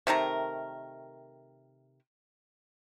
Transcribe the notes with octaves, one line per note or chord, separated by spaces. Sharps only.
C3 D#3 A3 A#4